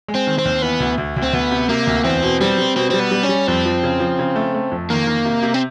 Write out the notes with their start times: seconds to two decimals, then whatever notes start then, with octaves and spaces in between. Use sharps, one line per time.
0.08 G#3
0.15 C4
0.27 D#3
0.39 C4
0.45 D#2
0.62 E3 B3
0.80 D2
0.98 D2
1.16 D2
1.23 C4
1.33 D2 B3
1.51 C3
1.69 C3 A#3
1.87 D2
2.04 E2 C4
2.23 B2
2.41 G3 C4
2.58 G3
2.76 B2 C4
2.90 G3 C4
3.00 B3
3.11 G3
3.23 C#4
3.29 G3
3.47 F2 C4
3.66 F3
3.83 C#3
4.00 F3
4.19 C#3
4.36 A3
4.55 A3
4.72 F2
4.90 D#3 A#3
5.07 D#3
5.25 C3
5.42 C3
5.54 C4